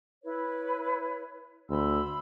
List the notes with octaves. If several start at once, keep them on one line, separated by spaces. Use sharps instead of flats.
E4 B4 C#5
D2 B5 C6 E6